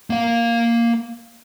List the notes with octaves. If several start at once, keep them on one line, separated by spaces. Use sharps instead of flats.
A#3 F5